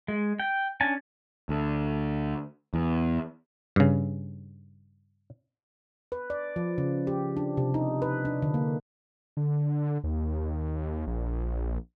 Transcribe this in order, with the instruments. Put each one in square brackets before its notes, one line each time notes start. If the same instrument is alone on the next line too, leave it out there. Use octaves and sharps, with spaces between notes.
[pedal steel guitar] G#3
G5
C#4 D4 G#5 A5
[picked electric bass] D2
E2
[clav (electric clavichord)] G2 C#3
[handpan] B4
D5
F3
C#3
G4
D4
C3
D#4
B4
D4
D3
A#3
[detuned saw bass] D3
D#2
A#1